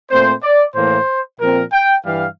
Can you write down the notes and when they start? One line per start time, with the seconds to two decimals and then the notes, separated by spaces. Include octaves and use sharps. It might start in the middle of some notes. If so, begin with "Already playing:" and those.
0.10 A#2 A3 C4 C5
0.43 D5
0.75 A2 E3 A#3 C5
1.40 A#2 F3 C4 A#4
1.72 G5
2.04 G2 E3 G3 F5